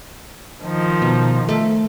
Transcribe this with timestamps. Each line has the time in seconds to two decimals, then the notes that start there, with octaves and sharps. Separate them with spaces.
0.62 D#3 F3 D#4
1.02 B2
1.49 A3